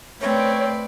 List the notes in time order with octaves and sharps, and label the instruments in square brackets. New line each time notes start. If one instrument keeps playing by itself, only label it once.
[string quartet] A3 B4 D5 [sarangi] C4 [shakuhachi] C#5